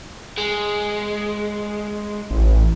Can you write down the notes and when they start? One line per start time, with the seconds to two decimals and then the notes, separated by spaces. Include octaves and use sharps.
0.38 G#3
2.31 A1